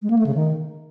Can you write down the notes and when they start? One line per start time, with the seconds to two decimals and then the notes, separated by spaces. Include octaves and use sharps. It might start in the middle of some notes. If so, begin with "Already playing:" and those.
0.02 G#3
0.10 A#3
0.18 A3
0.26 C#3
0.34 D#3